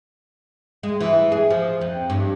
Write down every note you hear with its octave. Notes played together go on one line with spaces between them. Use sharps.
G#3
E3
G#4
F3
F2
G2